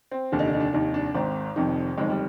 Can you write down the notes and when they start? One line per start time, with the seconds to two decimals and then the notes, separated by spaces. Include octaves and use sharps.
0.11 C4
0.32 F1 D#2 D3 D4
0.39 D#4
0.47 D4
0.53 D#4
0.60 D4
0.73 F1 D#2 D#3 D#4
0.94 D4
1.15 G#1 G#2 D#3 C4
1.56 F1 F2 D#3
1.97 G1 F2 D#3 G#3
2.10 G3